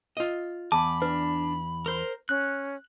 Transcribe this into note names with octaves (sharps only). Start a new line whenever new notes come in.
F4 D#5
E2 A5 B5 D6
D4 B4
A#4 C5
C#4 F#6